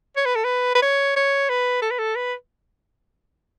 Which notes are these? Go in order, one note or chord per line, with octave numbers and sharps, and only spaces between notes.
C#5
B4
A4
B4
B4
C#5
C#5
B4
A4
B4
A4
B4